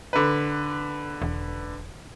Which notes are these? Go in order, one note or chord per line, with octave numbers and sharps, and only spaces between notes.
D3 B4
E1